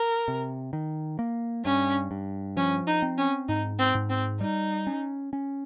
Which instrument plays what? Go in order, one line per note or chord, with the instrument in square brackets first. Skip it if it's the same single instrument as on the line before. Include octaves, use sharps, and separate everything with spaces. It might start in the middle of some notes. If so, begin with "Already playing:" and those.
Already playing: [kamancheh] A#4
[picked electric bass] C3
D#3
A#3
[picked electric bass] G2 [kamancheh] C#4
[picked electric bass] G2
[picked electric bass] F3 [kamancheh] C#4
[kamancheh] D#4
[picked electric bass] C4
[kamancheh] C#4
[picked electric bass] G#2 [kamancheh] D#4
[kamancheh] C4
[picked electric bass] G#2
[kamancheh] C4
[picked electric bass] G3 [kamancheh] D#4
[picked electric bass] C#4
C#4